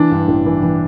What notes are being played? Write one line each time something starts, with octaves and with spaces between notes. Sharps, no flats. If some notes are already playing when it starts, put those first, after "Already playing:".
Already playing: E3 D4
G2
A1
E3
E3